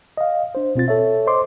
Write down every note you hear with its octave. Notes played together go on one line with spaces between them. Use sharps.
D#5 F5
D4 C5
B2 C4 F4 A6
A4 C#5 E5
C5 D#5 C6 D6